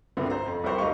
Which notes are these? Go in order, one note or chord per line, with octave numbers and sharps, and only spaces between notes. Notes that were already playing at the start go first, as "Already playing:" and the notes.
C2 G2 D3 A3 B3 C4
C5 A#5
F2
C2 G3 A#4 C5 C#6
F1 G4 D#5 F5 C#6